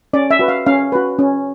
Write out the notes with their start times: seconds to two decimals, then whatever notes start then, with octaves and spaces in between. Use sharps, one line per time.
0.13 C#4 D5
0.31 E5
0.39 F#4 B4
0.48 F5
0.66 C#4 F5
0.92 F#4 B4
1.19 C#4